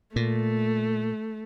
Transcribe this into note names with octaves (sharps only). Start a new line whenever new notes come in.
A#2 A3